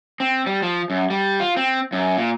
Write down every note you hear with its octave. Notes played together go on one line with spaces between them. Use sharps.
C4
G3
F3
F#2
G3
F4
C4
F#2
A#2